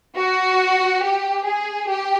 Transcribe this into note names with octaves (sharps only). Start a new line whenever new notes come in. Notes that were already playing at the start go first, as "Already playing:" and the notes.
F#4
G4
G#4
G4